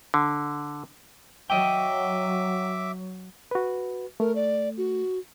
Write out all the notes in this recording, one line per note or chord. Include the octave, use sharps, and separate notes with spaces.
D3
F#3 D#5 E5 G5 D6
F#4 B4
A3 A#4
D5
F#4